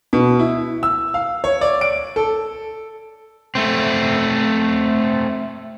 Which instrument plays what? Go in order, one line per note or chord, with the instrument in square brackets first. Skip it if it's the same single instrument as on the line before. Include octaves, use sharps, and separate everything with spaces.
[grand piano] B2
E4
E6
F5
C#5
D5
D7
A4
[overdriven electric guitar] A3 C4